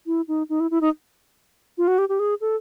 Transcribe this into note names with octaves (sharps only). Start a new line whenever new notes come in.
E4
D#4
D#4
E4
E4
D#4
F4
F#4
G4
G4
G#4
A4